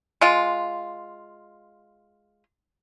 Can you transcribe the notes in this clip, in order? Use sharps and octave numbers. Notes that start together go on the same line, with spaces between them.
G#3 F4